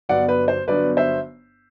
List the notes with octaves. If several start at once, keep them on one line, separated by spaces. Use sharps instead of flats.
G1 G2 F#3 B3 D4 D5 F#5
B4
C5
G1 G2 F#3 B3 D4 B4 D5
C5 E5